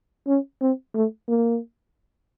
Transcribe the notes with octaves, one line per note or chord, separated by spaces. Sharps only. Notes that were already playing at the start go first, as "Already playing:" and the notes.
C#4
C4
A3
A#3